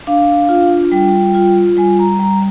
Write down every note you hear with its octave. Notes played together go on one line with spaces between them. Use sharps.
D4 F5
F4
G3 G5
F4
G3 G#5
A#5
G3 A#5